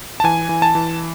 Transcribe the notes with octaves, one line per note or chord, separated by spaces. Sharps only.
A5
E3 G#5
E3
A5
E3